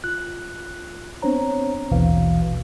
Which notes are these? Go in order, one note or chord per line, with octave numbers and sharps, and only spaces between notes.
F4 F#6
B3 C4 D4 C5 C#5 A#5
A1 D#2 B2 E3 B4 F5